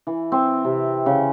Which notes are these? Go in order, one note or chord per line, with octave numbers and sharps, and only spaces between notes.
E3
C4
C3
C#3